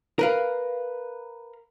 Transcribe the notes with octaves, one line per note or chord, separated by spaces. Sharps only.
A#4 B4 F5